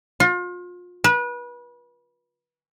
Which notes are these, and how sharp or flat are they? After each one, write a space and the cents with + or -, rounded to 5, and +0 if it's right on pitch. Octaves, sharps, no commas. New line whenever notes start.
F4 +35
B4 -30